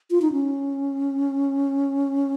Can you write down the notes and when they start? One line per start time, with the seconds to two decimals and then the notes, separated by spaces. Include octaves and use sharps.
0.11 F4
0.22 D#4
0.32 C#4